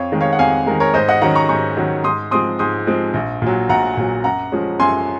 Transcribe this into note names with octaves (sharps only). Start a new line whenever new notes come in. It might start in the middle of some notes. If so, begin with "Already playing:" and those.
Already playing: F2 C#5 F5
D#3 G#3
C#5 F5
F#5
F2 F5 G#5
D#3 G#3 A#4
A#4 C#5
G#2 C5 D#5
D#5 F#5
D#3 F#3 C#4 F#5 A#5
A#5 C#6
G#2 A#5 C#6
D#3 F#3 C#4
G#2 C6 D#6
F3 G#3 C4 C6 D#6
G#2 C6 D#6
F3 G#3 C4
A#1
A#2 F#3
A#1 F#5 A#5
A#2 F#3
F#2 F#5 A#5
F3 G#3 C#4
F#2 G#5 C6